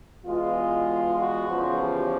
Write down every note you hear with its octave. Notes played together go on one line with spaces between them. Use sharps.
E2 B2 G#3 F4
F#4
E2 C#3 F3
G4